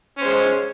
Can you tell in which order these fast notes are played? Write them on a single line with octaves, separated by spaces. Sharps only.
C#4 C5 G#3